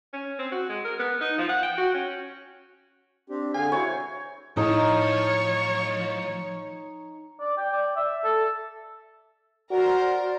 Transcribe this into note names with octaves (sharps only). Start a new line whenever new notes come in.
C#4
C4
F#4
G#3
A#4
B3
D#4
F3
F#5
G5
F#4
C#4
C4 D4 G4
D3 G#4 F5 G#5
E4 F#4 C5 C#5
A2 F3 D#4 C#5
D5
G5
D5
E5
A4
F#4 A#4 C5 D5